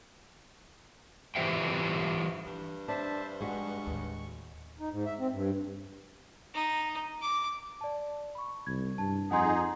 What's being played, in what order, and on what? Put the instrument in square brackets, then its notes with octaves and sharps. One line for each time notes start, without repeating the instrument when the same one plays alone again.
[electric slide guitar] E3 F4 G4 C5 E5 G5
[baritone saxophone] G2 [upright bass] F3
[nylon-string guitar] D4 [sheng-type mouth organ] C5 E5 A5
[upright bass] F3 [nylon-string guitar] G#3 F#4 [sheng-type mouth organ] C#6
[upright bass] D#2 A2
[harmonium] D#4
G#2
E5
C4
G2
[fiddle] D#4
D6
[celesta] D5 A5
B5 C#6
[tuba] C2 [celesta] G#6
[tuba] G2 [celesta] A5
[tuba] F2 [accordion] D#4 G#4 [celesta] F#5 G#5 C6